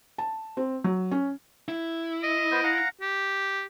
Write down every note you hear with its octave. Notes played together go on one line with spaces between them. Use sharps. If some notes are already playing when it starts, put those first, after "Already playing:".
A5
C4
F#3
C#4
E4
D#5
B3 C5
F5 F#5 A#5
G4